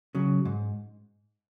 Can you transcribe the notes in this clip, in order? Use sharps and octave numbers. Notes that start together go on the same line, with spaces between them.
C#3 F#3
G#2